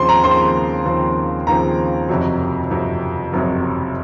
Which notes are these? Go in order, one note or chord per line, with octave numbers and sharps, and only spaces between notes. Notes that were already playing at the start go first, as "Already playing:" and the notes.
Already playing: D#2 C#3 F3 C4 C6
A#5
D#2 C#3 F3 C4 C6
D#2 C#3 F3 C4
D#2 C#3 F3 C4 A#5
F#1 F2 C3 F#3
F#1 F2 C3 F#3
F#1 F2 C3 F#3